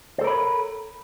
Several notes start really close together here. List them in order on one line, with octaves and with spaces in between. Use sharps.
C5 A4 A#4 B5 C#5